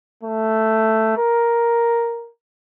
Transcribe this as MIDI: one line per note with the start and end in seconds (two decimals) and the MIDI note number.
0.23 1.15 57
1.17 2.29 70